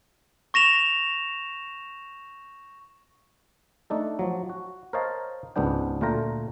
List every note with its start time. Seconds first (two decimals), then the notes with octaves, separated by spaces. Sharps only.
0.54 C#6 A#6 E7 F7
3.90 A3 D4 D#4 A4
4.19 F3 F#3
4.49 F#4
4.93 A#4 C5 C#5 D#5 F5 A5
5.56 C#2 G#2 B3 D4 G5
6.01 D2 A#2 A3 F4 G5 A#5